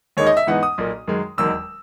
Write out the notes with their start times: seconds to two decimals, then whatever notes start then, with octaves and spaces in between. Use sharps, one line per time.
0.17 D#2 D#3 G#3 D#4 C#5
0.27 D#5
0.37 E5
0.47 G#2 E3 B3 D#4 F#5
0.63 D#6
0.78 B1 A#2 A#3
1.08 F#2 D#3 G#3
1.38 E1 D#2 D#3 F#3 E6